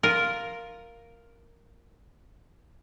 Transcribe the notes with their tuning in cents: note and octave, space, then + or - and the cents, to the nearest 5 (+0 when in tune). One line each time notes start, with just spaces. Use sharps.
F4 +0 A#4 +0